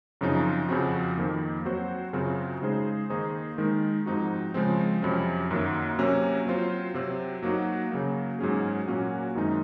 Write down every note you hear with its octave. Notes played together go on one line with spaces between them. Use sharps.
F#2 C#3 F3 C4 D#4
F2 C#3 F3 C4 F#4
F2 D#3 A#3
F#3 C4 F#4 C5
F#2 C#3 F#3 C4 F4
C#3 G#3 D#4 G#4 C5
D#3 A#3 D#4 G#4 C5
D#3 G#3 D#4 A#4
G#2 F3 C4 D#4 F#4
C#3 F3 G#3 C4
F2 C3 F#3 C#4
F#2 D#3 F#3 A#3
C3 F#3 A#3 C#4
F#3 C4 F4 C5
C3 F#3 C4
F#3 A#3 D#4 F#4
C#3 F#3 A#3
G#2 F#3 C#4 G#4
A#2 F#3 A#3 C#4 F#4
F#2 D#3 G#3 C4 D#4